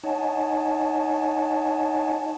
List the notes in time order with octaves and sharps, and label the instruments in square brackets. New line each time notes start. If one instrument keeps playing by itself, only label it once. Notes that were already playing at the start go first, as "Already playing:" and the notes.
[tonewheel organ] D#4 C#5 D#5 F#5 G#5 A5